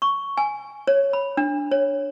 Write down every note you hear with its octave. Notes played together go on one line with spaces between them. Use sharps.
C#6
G#5
C#5
B5
D4
C#5